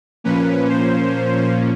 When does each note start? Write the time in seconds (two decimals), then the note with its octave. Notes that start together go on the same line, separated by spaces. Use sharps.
0.24 A#2 F3 A#3 C#4 B4
0.69 C5